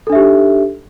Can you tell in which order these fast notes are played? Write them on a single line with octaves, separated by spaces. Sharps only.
A4 D4 E5 G4 D#4